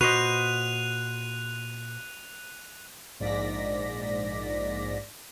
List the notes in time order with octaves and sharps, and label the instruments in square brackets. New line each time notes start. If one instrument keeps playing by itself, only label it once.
[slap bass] A#2 [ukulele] F#4 [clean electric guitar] B4 C5 D#5 [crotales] F#6 D#7 F7
[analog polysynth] A#1 G#2 D5 A#6 B6